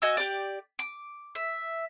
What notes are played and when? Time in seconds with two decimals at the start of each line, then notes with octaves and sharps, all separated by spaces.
0.02 F#4 D#5 G#5 E6
0.17 G4 D5
0.79 D6
1.35 E5